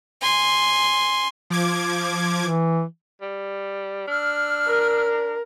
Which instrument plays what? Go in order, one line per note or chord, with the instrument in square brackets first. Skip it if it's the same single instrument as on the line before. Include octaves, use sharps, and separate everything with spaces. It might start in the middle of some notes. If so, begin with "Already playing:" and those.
[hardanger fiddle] G#5 C6
[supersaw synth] F3 D6 G#6
[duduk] E3
[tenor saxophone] G3
[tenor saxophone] D4 [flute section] E6 F6
[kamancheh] A#4